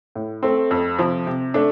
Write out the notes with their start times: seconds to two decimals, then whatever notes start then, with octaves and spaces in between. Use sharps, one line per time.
0.15 A2
0.43 A3 C4
0.71 F2
0.99 C3 F3
1.27 C3
1.54 A3 D4